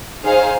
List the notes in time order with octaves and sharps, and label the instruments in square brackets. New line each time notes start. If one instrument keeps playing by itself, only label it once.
[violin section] D#4 G#4 C5 F5